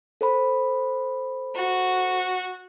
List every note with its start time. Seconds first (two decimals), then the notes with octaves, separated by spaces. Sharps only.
0.21 A4 C5 B5
1.56 F#4